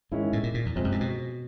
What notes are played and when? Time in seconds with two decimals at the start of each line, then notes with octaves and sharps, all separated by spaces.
0.12 G#2 D#3 G#3 C#4 E4
0.33 A2
0.43 A#2
0.54 A#2
0.66 E2
0.76 F2 C3 F3 G#3 C4 F4
0.84 F#2
0.92 G2
1.01 B2